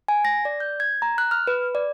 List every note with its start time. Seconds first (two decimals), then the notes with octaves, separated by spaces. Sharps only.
0.08 G#5
0.25 A#6
0.45 D5
0.60 G6
0.80 G#6
1.02 A#5
1.18 F#6
1.31 F6
1.47 B4
1.75 D5